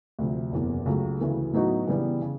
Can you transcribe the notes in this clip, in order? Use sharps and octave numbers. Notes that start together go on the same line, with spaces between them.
D2 C3 F3
F#1 E2 C3
C#2 C#3 F#3 A3
D2 C#3 E3 A3
A2 F#3 B3 D#4 F#4
C#3 E3 G3 B3
C#3